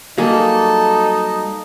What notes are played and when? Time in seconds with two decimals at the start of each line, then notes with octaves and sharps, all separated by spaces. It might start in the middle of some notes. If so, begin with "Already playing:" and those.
0.18 F#3 G3 A#3 D#4 G#4 A4